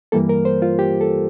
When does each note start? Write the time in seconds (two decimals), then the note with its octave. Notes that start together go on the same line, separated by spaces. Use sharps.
0.12 G2 E3 G3 A#3 A4
0.29 A#4
0.45 C5
0.62 F4
0.79 G4
1.01 A4